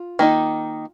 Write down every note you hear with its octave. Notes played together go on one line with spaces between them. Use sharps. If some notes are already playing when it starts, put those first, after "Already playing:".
Already playing: F4
D#3 A#3 D#4